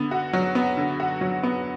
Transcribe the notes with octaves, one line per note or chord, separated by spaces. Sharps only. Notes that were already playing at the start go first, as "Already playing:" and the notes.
Already playing: D3 B3
F#4
F#3
B3
D3
F#4
F#3
B3